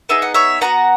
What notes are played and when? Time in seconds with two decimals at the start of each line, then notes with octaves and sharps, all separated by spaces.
0.09 B3 D#4 G#4 E5
0.22 F#5
0.34 C#5 E5
0.61 B3 F#4 F#5 A#5